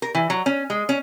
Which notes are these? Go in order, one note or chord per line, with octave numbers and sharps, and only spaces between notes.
A#4
E3
F#3
C#4
G#3
C#4